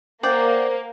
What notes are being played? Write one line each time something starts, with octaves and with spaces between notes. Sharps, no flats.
A#3 C5 D5 F#5 G5